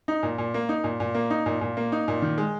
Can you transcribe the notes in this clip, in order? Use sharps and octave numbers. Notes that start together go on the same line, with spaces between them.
D#4
A#2
A#2
A#3
D#4
A#2
A#2
A#3
D#4
A#2
A#2
A#3
D#4
A#2
D#3
G#3